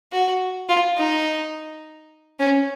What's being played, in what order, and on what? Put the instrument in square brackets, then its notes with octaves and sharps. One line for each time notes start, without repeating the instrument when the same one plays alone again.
[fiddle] F#4
F4
D#4
C#4